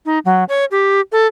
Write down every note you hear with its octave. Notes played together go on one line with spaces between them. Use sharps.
D#4
F#3
C#5
G4
A4